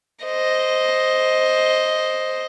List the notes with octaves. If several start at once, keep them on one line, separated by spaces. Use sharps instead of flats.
C5 D#5